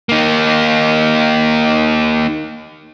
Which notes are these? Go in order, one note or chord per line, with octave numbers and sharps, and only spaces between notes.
A#3 D#4